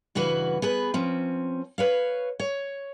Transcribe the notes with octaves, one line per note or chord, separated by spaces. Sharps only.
G2 C#3 E3 F#4 B4
B3 G#4 B4
F3 C4 C#4
B4 C#5 F5
C#5